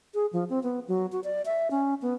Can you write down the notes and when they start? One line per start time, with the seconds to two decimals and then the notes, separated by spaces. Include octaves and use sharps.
0.14 G#4
0.33 F3
0.49 C4
0.63 B3
0.88 F#3
1.12 F#4
1.24 D5
1.45 E5
1.71 C#4
2.02 B3